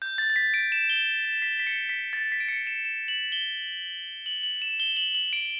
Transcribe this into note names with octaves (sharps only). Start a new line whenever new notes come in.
G6
A6
A6
B6
D7
E7
G7
E7
B6
B6
C#7
B6
A6
B6
D7
C#7
E7
E7
F#7
G7
F#7
F#7
E7
G7
F#7
F#7
D7